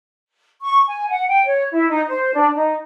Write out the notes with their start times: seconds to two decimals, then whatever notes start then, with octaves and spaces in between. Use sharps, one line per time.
0.62 C#6
0.87 G#5
1.10 F#5
1.29 G5
1.46 C#5
1.71 E4
1.89 D#4
2.08 C5
2.34 D4
2.55 D#4